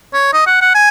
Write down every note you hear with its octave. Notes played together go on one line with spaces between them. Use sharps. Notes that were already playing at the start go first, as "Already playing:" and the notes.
C#5
D#5
F#5
F#5
G#5